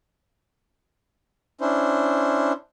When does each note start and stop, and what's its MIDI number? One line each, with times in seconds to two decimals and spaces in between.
1.61 2.52 61
1.61 2.52 62
1.61 2.52 64
1.61 2.52 72